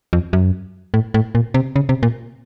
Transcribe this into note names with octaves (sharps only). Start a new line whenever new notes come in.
F2
F#2
A2
A2
A#2
C3
C#3
C3
A#2